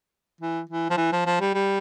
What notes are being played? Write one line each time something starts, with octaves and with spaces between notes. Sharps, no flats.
E3
E3
F3
E3
F3
F3
G3
G3